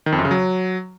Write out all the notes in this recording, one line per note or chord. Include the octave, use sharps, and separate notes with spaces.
D#3
F2
F#2
C#3
F#3